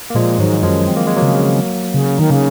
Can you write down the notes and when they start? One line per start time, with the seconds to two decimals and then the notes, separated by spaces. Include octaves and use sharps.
0.10 A#3
0.15 A#2 F3 G#3
0.39 G#2 D#3 F#3
0.63 F#2 F3 G#3
0.87 C4
0.97 A#3
1.07 G#3
1.16 F#3 A#3
1.22 C#3
1.94 C#3
2.18 D#3 D#4
2.30 C#3 A#3 C#4